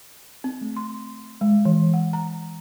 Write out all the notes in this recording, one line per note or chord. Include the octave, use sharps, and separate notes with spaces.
C4
A3
C6
G#3
E3
F#5
A#5